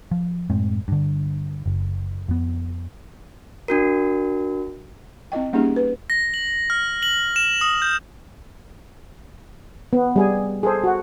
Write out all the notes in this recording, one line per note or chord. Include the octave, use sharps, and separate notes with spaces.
F3
F#2 A2 G#3 C4
G2 D3
F#1
F2 B3
D4 F#4 A#4
C4 E4 D#5 G5
G3 A#3 C#4 D#4 G4 G#4
B4
A#6
F#7
F6
F#7
E7
D#6
G6
B3
G3 G#4 G#5
G#4 A4 C5
F#4 F#5